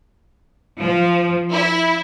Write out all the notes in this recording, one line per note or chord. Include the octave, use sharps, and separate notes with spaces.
F3
E4